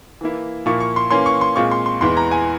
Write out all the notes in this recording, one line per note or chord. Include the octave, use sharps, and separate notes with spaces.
E3 A#3 E4
A#2 F3 A#3 E4 C#6
C#6
C6
E3 A#3 C#4 C6
C#6
C6
A#2 G#3 C4 F4 C#6
C6
C6
E2 E3 G#3 E4 C6
A#5
G#5